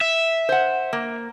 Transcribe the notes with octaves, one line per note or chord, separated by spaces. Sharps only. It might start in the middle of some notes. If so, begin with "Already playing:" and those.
E5
C5 F#5
A#3